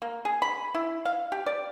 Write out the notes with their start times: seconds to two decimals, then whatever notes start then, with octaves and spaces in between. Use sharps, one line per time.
0.02 A#3
0.25 G#4
0.42 B5
0.75 E4
1.05 F5
1.32 G4
1.46 D5